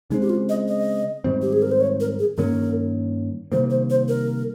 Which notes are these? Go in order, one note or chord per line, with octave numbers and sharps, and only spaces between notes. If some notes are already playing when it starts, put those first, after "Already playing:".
C#3 G#3 C4 D#4
G4
F4
D#5
D#5
G#2 D#3 G3 C4
G4
G#4
A#4
C5
C#5
A#4
G#4
G2 D#3 A#3 C#4 A#4
C3 D#3 G3 A#3 C5
C5
C5
A#4